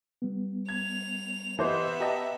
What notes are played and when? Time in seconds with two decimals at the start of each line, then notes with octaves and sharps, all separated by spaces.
0.22 G3 B3
0.69 G#6 F7
1.59 E3 B3 G4 C5 D#5 E5
2.00 G4 D#5 A5 A#5